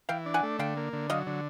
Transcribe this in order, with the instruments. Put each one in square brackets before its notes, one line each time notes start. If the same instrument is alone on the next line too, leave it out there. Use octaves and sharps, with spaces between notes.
[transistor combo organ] E3 [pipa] F5 G5
[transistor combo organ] D4
[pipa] F#5 G#5
[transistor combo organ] A3
[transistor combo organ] D3 [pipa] F5 G5
[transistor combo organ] A#3
D3
[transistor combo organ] F#3 [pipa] D#5 F5
[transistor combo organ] D3